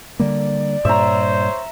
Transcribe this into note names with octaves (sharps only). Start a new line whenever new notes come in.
D3 G3 A#3 D5
G2 A#2 C5 C#5 E5 A#5